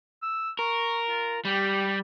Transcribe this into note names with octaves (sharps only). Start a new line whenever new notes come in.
E6
A#4 C#6
F4
G3 G4